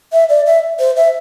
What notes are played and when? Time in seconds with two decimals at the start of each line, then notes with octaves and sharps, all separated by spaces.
0.12 E5
0.29 D5
0.46 E5
0.79 C5
0.96 E5